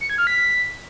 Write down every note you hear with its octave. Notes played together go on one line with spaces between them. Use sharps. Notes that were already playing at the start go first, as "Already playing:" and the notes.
C#7
G#6
F6
B6